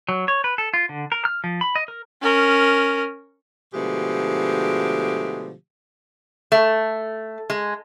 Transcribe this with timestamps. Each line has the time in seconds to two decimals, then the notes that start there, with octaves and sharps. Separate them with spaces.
0.09 F#3
0.28 C#5
0.44 B4
0.58 A4
0.74 F4
0.89 D3
1.12 A#4
1.25 F6
1.44 F3
1.61 B5
1.76 D#5
1.88 A#4
2.22 C#4 A#4
3.74 B2 D3 F3 G#3 A3 G4
6.52 A3
7.50 G#3